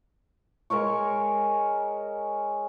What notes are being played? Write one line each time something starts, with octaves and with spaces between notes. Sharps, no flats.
G#3 A#4 C#5 C#6